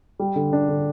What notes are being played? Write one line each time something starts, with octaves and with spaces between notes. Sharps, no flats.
G3
D3
D4
D3